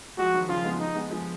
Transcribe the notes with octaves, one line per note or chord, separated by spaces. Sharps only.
F3 G#3 F#4
D#3 F#3
C#3 F3 F4
G#3 B3
D#4
G#3 B3
F3 G#3